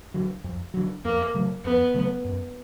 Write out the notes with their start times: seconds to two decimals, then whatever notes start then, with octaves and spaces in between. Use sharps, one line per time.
0.14 D3 F#3
0.44 F2
0.74 D3 F#3
1.05 F2 A#3
1.34 C#3 F#3 A3
1.64 F2 B3
1.94 C#3 F#3 A3
2.25 F#2